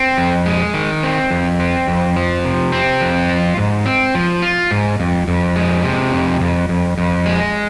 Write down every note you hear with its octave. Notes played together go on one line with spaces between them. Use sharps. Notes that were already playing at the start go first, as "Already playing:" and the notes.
Already playing: C4
F2
G#3
D#3
C4
F2
C4
F2
F3
C3
C4
F2
F4
G#2
C4
F3
F4
G#2
F2
F2
G#3
C3
F2
F2
F2
F2
G#3